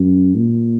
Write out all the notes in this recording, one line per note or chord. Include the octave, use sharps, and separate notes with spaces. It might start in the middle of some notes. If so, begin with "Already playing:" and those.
Already playing: F#2
A#2